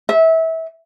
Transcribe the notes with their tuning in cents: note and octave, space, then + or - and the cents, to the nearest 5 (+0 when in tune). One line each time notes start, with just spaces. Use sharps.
E5 -25